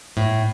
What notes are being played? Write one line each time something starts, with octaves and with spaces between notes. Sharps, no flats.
A2